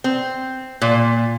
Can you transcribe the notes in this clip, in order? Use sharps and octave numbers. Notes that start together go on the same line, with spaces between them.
C4
A#2